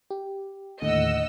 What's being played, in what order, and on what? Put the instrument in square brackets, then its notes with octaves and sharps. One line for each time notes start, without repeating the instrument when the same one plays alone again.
[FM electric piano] G4
[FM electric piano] D#2 A2 D3 [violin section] D#5 F#5 E6